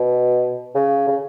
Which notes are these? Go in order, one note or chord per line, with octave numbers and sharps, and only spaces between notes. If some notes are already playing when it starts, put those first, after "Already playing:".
Already playing: B2
C#3
C#3